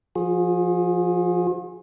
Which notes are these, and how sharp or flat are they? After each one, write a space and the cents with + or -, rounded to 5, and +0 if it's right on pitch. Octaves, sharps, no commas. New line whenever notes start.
F3 -5 F4 +45 G#4 +0